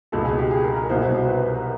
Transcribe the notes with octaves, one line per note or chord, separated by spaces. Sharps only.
C#2 B2 F#3 A4
G#4
G4
G#4
A#4
A#4
C2 B2 F#3 C5
C5
C5
B4
A#4